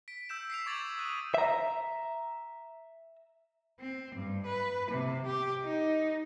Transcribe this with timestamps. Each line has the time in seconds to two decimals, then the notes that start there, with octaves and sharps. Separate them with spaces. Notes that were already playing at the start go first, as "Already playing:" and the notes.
0.08 B6 D7
0.29 E6 G6 E7
0.50 B6 C7 D7 F7
0.66 C#6 D6 G#6 A6 F7 F#7
0.98 D#6 F#6 D#7
1.34 E5 A#5
3.80 C4
4.15 G2
4.46 B4
4.91 C3
5.26 G4
5.64 D#4